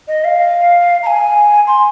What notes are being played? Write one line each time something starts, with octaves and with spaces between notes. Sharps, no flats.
D#5
F5
A#5
G#5
C6